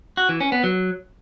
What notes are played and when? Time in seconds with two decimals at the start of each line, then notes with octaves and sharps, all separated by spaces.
0.17 F#4
0.29 E3
0.40 C#4
0.52 B3
0.64 F#3